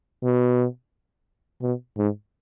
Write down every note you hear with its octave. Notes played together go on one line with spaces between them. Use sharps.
B2
B2
G#2